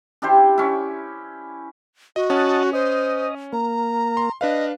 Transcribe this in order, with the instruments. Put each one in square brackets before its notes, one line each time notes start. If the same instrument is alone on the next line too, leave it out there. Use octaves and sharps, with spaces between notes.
[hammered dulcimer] D4 E4 G4 C5
C#4 E4
[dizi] F#4 [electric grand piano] D#5
[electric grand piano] C#4 [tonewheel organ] D#5 F#5 A5
[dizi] C5 [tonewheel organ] D#5
[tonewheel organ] A#3 [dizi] A#5
[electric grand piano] C6
[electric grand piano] D4 B4 F5 [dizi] D#5